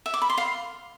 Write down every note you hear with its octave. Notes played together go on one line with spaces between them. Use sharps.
E5
D6
B5
C6
F5